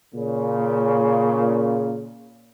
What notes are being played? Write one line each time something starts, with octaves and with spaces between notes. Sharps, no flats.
A#2 C#3